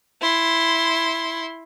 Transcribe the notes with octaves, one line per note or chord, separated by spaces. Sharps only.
E4 C6